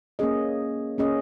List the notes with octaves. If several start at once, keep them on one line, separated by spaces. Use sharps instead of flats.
A#3 C#4 G#4 D#5
A#3 C#4 G#4 D#5